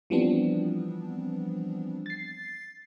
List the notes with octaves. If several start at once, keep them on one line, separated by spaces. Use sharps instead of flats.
E3 F3 G3 B3 C4 D4
A6 C7